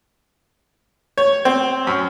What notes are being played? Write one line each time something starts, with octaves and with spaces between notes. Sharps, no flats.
C#5
C4
F#2